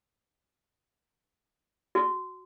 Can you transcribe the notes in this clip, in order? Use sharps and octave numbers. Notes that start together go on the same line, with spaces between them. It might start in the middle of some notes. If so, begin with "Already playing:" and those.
F#4